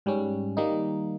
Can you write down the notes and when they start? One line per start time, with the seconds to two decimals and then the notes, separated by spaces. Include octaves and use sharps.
0.06 G#2 G3 C#4
0.57 D#3 G3 A#3 D#4